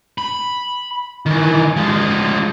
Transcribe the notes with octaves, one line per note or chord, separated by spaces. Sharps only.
B5
D#3 E3
F3 G#3